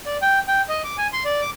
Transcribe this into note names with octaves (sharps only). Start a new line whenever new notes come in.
D5
G5
G5
D#5
D6
G#5
C6
D5
D6